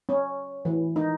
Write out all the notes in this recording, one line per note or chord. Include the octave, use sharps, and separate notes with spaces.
C#4
E3
D#4